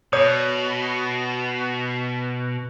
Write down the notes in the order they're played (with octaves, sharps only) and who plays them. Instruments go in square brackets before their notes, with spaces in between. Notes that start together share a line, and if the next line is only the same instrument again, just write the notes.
[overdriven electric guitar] B2 [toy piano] C#5 D5 D#6